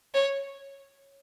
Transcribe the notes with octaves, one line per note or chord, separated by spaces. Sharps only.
C#5